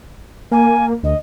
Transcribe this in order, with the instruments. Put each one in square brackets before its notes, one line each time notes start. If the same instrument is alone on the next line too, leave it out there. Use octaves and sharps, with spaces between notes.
[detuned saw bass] A#3 [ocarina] G#5
[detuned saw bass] D2 [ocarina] D#5